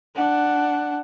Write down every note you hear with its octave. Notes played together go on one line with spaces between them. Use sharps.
D4 F#5